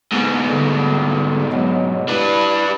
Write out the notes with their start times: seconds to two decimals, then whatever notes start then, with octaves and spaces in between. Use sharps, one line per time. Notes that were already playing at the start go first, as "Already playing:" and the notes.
0.12 G#2 B2
0.49 D3 G3
1.52 F#3 G#3 B3
2.09 D4 E4 G4 B4